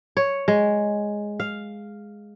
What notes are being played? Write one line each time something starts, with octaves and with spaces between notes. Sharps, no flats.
C#5
G#3
F5